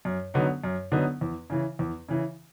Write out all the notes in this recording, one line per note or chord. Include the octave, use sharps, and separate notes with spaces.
F#2
D3 F#3 B3 D#4
F#2
D3 F#3 B3 D#4
E2
C#3 E3
E2
C#3 E3